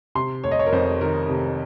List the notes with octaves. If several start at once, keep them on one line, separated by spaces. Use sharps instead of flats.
C3 C6
F1 C#5
D#5
C#5
A#4
F2 C5
D#3 A#4
C3